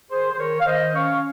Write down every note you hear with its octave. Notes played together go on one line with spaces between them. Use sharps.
D#3 G#4 C5
C5
D#3 A#4 C#5
F5
D#3 C5 D#5
C#4 C#5 F5